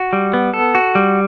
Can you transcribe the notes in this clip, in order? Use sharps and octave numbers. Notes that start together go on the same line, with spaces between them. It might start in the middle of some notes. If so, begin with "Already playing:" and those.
Already playing: F#4
G3
B3
A4
F#4
G3